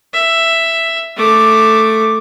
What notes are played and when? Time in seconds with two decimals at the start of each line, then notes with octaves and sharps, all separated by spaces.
0.14 E5
1.17 A3 D6